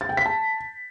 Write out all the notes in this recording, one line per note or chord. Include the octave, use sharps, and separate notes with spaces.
A6
G5
B6
A5